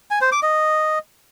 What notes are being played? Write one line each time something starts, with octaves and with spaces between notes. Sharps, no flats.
G#5
C5
D6
D#5